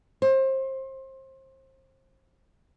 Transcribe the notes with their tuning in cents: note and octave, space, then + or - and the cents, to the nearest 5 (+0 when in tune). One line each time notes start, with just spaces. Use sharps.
C5 +30